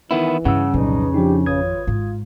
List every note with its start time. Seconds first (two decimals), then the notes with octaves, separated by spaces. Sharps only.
0.11 D#3 E3 B3 E4
0.45 G2 C#3 F#5 E6
0.74 C2 F2 A#2 F#3 D4 D#4 B4
1.14 F3 D4 D#4 G4
1.46 G#1 F4 B4 C#5 D#6 G#6
1.87 G#2 F4